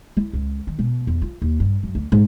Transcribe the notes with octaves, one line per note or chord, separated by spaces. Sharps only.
E4
C#2
D#3
B2
E2
F4
D#2
G2
F#2
D2
G#2